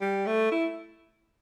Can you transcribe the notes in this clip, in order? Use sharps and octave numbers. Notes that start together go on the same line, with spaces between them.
G3
A3
E4